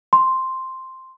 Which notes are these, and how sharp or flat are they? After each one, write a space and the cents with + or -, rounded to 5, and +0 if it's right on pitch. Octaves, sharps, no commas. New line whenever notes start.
C6 +0